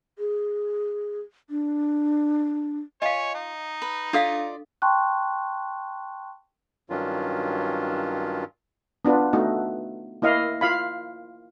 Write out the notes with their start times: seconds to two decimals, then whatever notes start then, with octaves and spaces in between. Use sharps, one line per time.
0.19 G#4
1.50 D4
3.02 F4 C#5 D#5 F5 G#5
3.35 D#4
3.82 B4
4.13 D4 F4 A4 D5 D#5 F5
4.82 G5 A5 C6 C#6 F#6
6.90 G2 D#3 F#3 C#4 D4 F4
9.05 B3 D4 F4 B4
9.33 A3 B3 D#4 F#4
10.22 A#3 E4 D#5 F5
10.61 F4 F5 B5